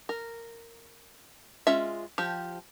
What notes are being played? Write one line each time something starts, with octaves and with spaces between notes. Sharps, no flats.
A#4
G#3 C#4 F4 E5
F3 G4